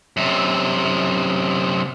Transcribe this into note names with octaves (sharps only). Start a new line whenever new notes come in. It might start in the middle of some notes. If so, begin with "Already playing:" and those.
F#2 C3